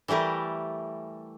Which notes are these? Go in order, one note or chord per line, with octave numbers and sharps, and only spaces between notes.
E3 G3 A3 G4 A#4